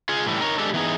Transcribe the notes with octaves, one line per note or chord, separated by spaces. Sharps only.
F4 G#4
A2 E3 G3
D#4 A#4 C#5
G#3 D4 G4 A4
E3 B3 D#4 G#4